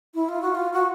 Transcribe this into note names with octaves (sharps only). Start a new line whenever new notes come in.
E4
F4
F#4
F4
F#4